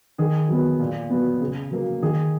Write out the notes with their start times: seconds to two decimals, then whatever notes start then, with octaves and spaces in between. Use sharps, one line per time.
0.18 D#3 G#4
0.49 F#3 B3
0.79 A#2
1.10 F#3 B3
1.41 C#3
1.71 F#3 A#3
2.02 D#3 G#4